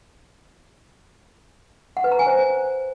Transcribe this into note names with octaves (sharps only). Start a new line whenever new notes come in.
F#5
B4
A#5
G#5
C5